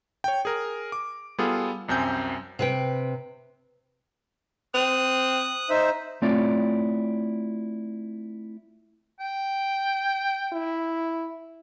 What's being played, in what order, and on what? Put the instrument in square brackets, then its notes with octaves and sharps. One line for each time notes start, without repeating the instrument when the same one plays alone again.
[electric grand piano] C#5 G5
G#4 A#4
D6
G3 B3 F4 G#4 A4
C2 F#2 C4 G#5 G6
[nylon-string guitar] C3 B4 G5
[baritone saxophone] C4 [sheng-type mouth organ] D#6 F#6
[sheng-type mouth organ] D#4 C5 E5
[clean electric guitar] A3 C4 E4 F4 C#5 D5
[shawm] G5
[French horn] E4